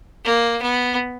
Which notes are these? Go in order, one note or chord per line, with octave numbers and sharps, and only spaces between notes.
A#3
B3